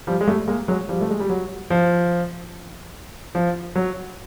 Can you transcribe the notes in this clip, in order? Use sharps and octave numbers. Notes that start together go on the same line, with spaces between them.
F3 G3
G#3
G3 A3
G#3 A#3
F#3 G#3
F3 G3
A3
G#3
G3
F#3
F3
F3
F#3